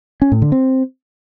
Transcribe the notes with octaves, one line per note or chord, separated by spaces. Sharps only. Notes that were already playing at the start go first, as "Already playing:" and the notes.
C#4
A2
D3
C4